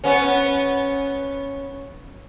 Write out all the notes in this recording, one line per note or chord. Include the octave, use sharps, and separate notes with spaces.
B3 C#4